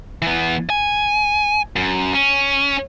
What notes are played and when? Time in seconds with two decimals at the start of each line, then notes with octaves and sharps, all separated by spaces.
0.22 E3 B3
0.70 G#5
1.76 F#2
2.14 C#4